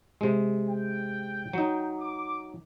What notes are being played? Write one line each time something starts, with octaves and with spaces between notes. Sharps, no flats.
C3 G#3
G5
F#3 D#4
D6